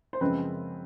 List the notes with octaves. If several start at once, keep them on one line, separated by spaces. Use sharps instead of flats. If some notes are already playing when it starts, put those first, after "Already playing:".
C5
F#2 C#3 F3 G#3 C4 B4